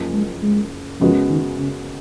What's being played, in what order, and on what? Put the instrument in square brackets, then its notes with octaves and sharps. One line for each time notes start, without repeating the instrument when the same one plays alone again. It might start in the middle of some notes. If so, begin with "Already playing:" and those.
Already playing: [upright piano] F#1 F#2 F3 A#3
[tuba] G#3
G#3
[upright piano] F#2 C#3 G#3 B3 F#4 [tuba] F3
[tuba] D#3
C#3